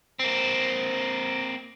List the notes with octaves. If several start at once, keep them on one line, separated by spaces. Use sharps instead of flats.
A#3 C4